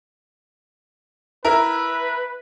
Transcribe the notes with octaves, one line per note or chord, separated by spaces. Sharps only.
E4 A#4 B4